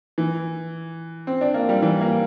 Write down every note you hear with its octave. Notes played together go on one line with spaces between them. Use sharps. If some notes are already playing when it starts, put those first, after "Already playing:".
E3
C4
D4
A#3
G3
E3
A#3